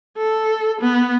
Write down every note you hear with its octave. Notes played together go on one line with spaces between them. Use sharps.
A4
B3